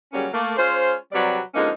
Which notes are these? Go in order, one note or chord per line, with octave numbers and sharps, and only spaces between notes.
C#3 F#3 G3 A#3 C#4
A3 A#3
G#3 C#4 F4 C5
C3 F#3 G3 B4 D5
D3 F3 G#3 A#3 C#4 D#4